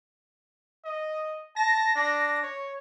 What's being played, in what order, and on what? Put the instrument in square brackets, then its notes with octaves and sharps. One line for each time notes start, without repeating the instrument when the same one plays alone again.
[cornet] D#5
[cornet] A5 [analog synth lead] A#6
[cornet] D4
C#5